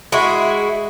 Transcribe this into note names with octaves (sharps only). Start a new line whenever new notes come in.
G#3 E4 F#4